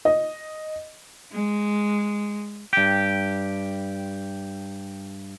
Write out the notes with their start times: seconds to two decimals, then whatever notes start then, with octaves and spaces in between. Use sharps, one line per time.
0.05 D#5
1.33 G#3
2.73 G2 G4